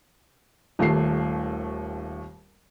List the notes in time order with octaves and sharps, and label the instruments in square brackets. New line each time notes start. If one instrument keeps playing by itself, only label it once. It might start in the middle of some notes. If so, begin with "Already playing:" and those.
[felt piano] D#1 D#2 A3 C7